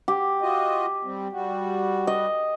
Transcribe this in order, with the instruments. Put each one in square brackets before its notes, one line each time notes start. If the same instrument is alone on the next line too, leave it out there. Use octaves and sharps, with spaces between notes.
[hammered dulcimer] G4
[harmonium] F4 F#4 D#5
G3 C4
G3 F#4
[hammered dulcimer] D#5